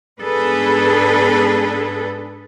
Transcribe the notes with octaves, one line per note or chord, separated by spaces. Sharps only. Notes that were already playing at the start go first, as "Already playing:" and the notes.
G#2 B3 D4 G#4 A4 B4